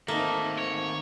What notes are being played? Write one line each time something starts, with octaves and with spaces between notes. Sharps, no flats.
D#3 A3 A#3 C4 D#4
C#5